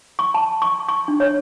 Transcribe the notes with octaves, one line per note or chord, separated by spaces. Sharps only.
C#6
A5
C#6
C#6
D4
C#5